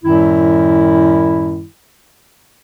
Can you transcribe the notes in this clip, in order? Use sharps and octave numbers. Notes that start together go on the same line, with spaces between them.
F#2 A2 D#3 G3 E4